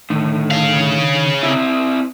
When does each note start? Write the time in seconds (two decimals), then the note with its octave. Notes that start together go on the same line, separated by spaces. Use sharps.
0.10 A2 D3 D#3
0.51 C#3 F5
1.43 C4 E4